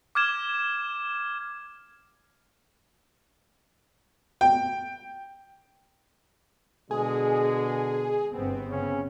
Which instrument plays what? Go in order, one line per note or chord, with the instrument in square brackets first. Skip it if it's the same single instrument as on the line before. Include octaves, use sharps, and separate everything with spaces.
[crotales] D6 F6 G#6 E7
[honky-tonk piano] G5
[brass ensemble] B2 D3 G#3 [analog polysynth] G#4
[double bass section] G1 B3 C4
[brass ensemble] C#3 C#4